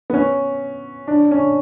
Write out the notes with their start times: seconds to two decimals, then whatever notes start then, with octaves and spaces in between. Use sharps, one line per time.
0.10 B3
0.14 C#4
1.07 D4
1.31 C#4